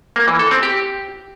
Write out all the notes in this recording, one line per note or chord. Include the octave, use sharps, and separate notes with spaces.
A#3
E3
A4
C4
G4